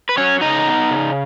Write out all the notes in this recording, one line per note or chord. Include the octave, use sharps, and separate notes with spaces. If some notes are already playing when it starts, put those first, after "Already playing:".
B4
F#3 C#4 C#5
C#3 D#4 D#5
B3
C#3